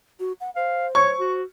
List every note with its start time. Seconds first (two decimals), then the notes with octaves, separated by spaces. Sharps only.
0.20 F#4
0.41 F#5
0.56 C5 F5
0.95 C#5 C#6
1.20 F#4